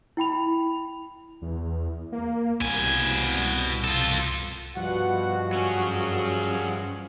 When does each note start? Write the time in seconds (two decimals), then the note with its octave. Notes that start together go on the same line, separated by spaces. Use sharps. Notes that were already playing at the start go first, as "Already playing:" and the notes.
0.17 E4 G5 B5 F7
1.42 E2
2.12 A#3
2.61 C2 B2 G#5
3.84 F4 A4
4.77 G2 B2 F3 F#4 F#5
5.53 F#3 C#4 G#4